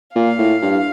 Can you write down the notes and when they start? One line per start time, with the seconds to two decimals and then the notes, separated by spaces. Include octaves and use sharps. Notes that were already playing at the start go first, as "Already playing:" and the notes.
0.15 A#2 F5
0.39 A2
0.62 G2